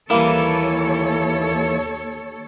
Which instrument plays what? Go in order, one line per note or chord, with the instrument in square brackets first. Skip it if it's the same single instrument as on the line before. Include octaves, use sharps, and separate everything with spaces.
[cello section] D#2 A4 C#5 [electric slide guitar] E3 E4 [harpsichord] G3 A#3